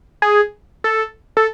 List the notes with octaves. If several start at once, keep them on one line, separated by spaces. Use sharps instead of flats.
G#4
A4
A4